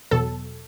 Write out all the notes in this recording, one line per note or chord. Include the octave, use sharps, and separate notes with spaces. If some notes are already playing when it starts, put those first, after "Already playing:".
E2 B2 F#3 A4